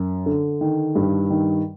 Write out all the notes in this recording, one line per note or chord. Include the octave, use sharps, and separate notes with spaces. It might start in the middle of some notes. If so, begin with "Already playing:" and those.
Already playing: F#2
D3
D#3
G2
D#3